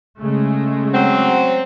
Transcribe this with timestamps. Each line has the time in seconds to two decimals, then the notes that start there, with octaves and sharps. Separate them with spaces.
0.20 C#3 G#3 A3
0.94 F#3 C4